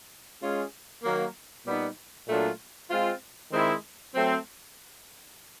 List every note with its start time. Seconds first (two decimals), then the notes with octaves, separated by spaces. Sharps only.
0.42 G#3 C#4 F4 G#4
1.04 D#3 F#3 A#3
1.66 A#2 G3 B3 D#4
2.28 A#2 F#3 A3 D4 F4
2.90 G#3 C4 F4
3.52 D#3 G#3 C4 E4
4.15 F#3 A3 C4